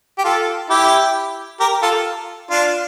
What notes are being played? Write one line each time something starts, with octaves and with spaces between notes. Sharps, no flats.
G4
F4 A4
E4 G4
G4 A#4
F4 A4
D4 F4